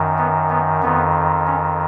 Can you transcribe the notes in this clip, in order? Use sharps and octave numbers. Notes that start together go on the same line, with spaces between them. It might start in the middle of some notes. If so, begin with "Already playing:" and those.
Already playing: F#2 D#3
B3
B3
F2 D#3 B3
C#4